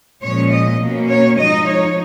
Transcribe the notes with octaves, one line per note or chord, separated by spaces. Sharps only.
A#2 F3 G#3 C#4 C#5
D#5
B2 A#3 C#4
C#5
F3 G#3 D#4 D#5
C#5